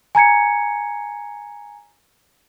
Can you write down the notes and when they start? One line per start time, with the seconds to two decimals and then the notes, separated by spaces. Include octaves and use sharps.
0.15 G#5 A#5 G#6 C#7